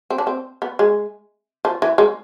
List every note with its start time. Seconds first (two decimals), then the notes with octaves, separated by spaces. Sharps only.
0.10 C4
0.18 D4
0.27 C4
0.62 B3
0.79 G#3
1.65 F3
1.82 E3
1.98 G#3